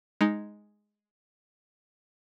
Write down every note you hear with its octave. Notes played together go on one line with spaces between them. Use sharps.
G#3 D#4